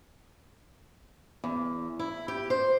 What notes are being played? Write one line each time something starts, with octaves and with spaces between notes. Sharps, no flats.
E2
E4
G4
C5